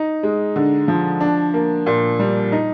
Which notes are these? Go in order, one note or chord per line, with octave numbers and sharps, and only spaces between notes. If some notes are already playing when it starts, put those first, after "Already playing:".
Already playing: D#4
G#3
D3
F3
D4
A#3
A#2
G3
D#4